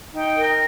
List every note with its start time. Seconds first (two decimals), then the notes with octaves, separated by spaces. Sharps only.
0.13 D#4 G5
0.37 A#4